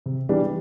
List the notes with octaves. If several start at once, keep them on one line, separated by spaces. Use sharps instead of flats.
C3
E3 G3 D4 G4